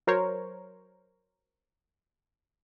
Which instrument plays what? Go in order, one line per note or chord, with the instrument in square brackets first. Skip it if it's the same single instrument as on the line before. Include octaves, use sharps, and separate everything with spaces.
[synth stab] F#3 A#4 C5 C#5